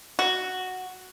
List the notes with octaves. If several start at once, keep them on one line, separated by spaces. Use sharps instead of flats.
F#4